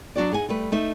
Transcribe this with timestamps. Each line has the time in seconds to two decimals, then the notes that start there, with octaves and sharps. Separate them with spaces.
0.16 F#3 D4 F#4 D5
0.31 D#4 G#4 F#5 G#5
0.49 G3 A3 B4
0.72 A3 D#4 E5